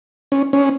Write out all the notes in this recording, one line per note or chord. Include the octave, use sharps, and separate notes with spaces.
C#4
C#4